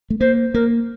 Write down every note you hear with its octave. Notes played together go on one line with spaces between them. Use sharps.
A3
A#3 C5
A#3 A#4